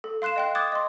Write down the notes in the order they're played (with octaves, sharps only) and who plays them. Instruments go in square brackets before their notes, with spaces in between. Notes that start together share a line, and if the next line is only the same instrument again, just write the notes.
[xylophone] A4
F5 C6 F#6 C7 E7
D#5 G5 F#6
D6 D#6 F#6 G#6 A6
D#5 C6